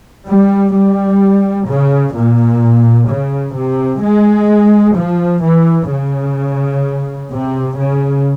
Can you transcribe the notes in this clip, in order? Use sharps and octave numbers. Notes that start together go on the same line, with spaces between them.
G3
G3
C#3
A#2
C#3
C3
G#3
F3
E3
C#3
C3
C#3